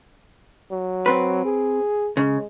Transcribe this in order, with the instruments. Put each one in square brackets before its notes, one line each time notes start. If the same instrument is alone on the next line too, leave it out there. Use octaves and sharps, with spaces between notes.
[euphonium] F#3
[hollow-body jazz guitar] C4 B4
[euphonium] G#4
[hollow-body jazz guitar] C#3 [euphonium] G#3